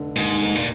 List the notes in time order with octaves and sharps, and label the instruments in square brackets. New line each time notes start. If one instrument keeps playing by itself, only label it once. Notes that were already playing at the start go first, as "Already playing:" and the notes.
Already playing: [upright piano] F1 D3
[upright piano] D#2 [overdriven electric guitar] G#2
[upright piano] F1
[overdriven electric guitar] A#2